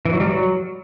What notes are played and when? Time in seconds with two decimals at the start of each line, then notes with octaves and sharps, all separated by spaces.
0.05 E3
0.13 F#3
0.20 G3
0.27 F#3